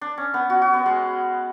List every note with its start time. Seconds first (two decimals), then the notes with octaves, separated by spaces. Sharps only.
0.01 D4
0.18 C#4
0.34 B3
0.50 F#4
0.62 F#4
0.73 B3
0.86 G#3